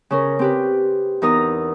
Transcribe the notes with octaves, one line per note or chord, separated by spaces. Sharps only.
C#3 C#4 A#4
C4 G4 B4
E2 D#4 A#4 A#5 D#6